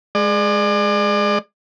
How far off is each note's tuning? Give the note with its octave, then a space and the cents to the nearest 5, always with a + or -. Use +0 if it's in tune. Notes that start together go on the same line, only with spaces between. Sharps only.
G#3 +0 D5 +35